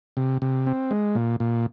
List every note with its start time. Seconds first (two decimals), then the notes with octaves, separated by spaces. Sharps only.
0.17 C3
0.42 C3
0.67 C4
0.91 G#3
1.15 A#2
1.40 A#2